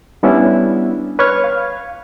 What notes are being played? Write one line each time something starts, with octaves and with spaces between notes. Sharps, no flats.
G3 B3 C#4 D4 E4
B4 C#5 C#6 F6 G#6
F5